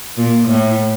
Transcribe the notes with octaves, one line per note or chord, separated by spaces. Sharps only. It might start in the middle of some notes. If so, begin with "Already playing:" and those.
A#2
A2